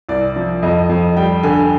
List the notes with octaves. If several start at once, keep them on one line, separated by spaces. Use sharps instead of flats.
C2 D5
F3
F2 D#5
F2
G3 G5
D3 G#5